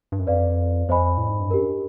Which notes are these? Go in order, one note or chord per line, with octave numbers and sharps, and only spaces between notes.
G2
F#2
F2 B4 D5 F5
F2 C5 D#5 G#5 B5
A2
G#2
G2
F#2 D4 G4 A#4